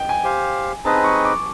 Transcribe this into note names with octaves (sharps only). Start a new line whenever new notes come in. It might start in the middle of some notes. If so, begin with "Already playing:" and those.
Already playing: D#5 G5
G#5
G4 C5 F5
C4 D#4 G#4 B4 D#5 A5
C#6
D6